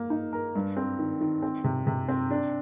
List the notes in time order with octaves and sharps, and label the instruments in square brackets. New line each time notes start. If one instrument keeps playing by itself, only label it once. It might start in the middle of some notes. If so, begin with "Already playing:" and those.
Already playing: [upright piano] A#3
D#4
A#4
G2
C4
D#3
D#3
C4
C3
C3
C4
D4